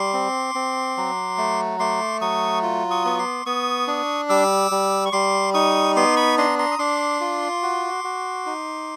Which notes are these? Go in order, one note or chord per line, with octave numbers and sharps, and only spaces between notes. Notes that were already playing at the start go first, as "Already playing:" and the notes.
Already playing: G3 C6 D6
C4
C4
F#3
A3
A3 C6 D6
F#3 C#6 D#6
F4
C#6 D#6
B3 C#6
C6 D6
B3 C#6 D#6
D4
G3 D6 E6
G3
C#6
G3 C6 D6
D#4 C#6 D#6
B3 C6 D6
B5 C#6
D4 A#5 C6
A#5 C6
D#6
D4 C6 D6
F4
F#4
F#4
D#4